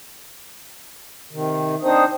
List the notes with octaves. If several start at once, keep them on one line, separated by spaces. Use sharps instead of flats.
C3 D#3
C4 D4 D#4 C5 D#6